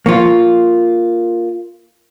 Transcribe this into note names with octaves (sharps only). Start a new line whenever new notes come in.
F3 A#3 F4 C#6 C#7